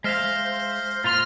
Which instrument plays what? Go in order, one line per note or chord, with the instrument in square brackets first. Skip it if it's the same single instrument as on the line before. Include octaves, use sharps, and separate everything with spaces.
[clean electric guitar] G#3 E5 F5 [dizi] C5 [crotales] F6 A#6 C7
[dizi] C5
[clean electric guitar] A#2 F4 C6 [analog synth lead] F6 [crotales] A6